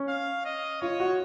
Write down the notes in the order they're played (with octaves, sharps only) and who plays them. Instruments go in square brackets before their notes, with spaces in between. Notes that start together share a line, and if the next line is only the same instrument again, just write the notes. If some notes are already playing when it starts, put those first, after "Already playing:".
Already playing: [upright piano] C#4
[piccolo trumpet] F5
D#5
[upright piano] F4 [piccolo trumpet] C#5
[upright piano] F#4